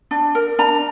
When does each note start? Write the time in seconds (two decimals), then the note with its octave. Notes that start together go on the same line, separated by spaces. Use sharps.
0.11 D4
0.35 A#4
0.59 D4 A#5